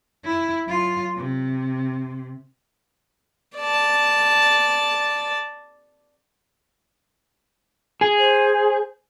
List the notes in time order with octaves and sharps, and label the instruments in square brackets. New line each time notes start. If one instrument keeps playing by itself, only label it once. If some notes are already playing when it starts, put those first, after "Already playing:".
[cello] E4
F#3 F4
C3
[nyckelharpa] D5 A5
[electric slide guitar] G#4
[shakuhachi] C5